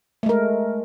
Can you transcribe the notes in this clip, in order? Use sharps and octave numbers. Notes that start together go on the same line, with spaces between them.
G#3 A3 A#4